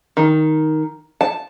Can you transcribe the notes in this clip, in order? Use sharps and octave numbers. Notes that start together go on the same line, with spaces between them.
D#3
A5